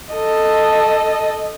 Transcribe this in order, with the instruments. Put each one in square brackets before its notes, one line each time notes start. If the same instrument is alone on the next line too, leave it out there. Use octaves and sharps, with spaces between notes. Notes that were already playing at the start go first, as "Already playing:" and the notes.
[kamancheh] A4 D#5